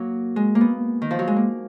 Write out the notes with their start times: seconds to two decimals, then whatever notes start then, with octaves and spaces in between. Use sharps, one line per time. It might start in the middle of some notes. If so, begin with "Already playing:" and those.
Already playing: F#3 A#3
0.36 G#3
0.55 A#3
0.61 B3
1.02 D#3
1.11 F3
1.19 F#3
1.28 G#3
1.36 A#3